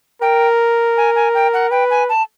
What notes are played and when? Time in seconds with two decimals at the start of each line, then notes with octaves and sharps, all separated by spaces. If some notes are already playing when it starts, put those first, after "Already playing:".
0.22 A#4 G5
0.97 G#5
1.15 G#5
1.34 G5
1.54 F#5
1.71 B4 G5
1.90 G#5
2.09 A5